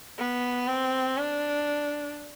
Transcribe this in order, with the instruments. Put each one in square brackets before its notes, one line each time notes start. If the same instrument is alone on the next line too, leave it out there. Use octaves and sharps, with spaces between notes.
[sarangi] B3
C4
D4